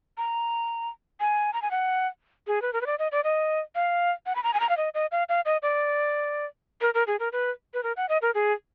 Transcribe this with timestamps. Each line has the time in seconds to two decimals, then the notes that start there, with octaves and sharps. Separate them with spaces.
0.18 A#5
1.20 G#5
1.53 A#5
1.62 G#5
1.71 F#5
2.47 G#4
2.62 B4
2.73 A#4
2.81 B4
2.86 D5
2.99 D#5
3.12 D5
3.24 D#5
3.75 F5
4.26 F#5
4.36 B5
4.43 A#5
4.54 G#5
4.60 A#5
4.69 F5
4.77 D#5
4.94 D#5
5.12 F5
5.29 F5
5.45 D#5
5.62 D5
6.81 A#4
6.94 A#4
7.07 G#4
7.20 A#4
7.32 B4
7.74 B4
7.83 A#4
7.97 F#5
8.09 D#5
8.22 A#4
8.35 G#4